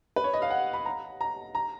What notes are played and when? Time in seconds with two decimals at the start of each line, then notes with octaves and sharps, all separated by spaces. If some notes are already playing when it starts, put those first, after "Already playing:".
0.16 B4
0.24 C#5
0.34 D#5
0.42 F5
0.50 F#5
0.73 B5
0.86 A#5
1.21 A#5
1.55 A#5